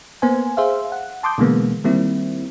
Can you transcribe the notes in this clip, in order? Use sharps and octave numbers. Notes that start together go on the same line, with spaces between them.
A#3 B3 C5 G#5
G#4 C5 E5 F5
F#5
A5 C6 D6 D#6 G6
B2 D3 E3 G#3 A#3 B3
D#3 G3 A#3 C4 E4